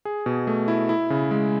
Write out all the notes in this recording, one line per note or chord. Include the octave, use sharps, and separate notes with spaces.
G#4
B2
A3
E4
E4
C#3
G#3